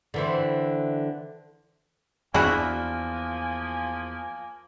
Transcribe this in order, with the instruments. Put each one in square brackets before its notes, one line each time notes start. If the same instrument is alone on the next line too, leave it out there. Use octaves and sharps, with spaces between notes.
[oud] D3 E3 C4
[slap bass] E2 [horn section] F3 A#3 G#5 [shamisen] D4 G#4 [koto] E4 F#4